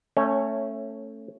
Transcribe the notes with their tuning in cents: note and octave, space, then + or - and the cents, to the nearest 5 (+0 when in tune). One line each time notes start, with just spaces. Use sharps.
A3 +15 C#4 -10 C#5 +0